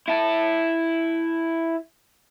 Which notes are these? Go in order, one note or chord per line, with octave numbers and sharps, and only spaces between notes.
E4 A5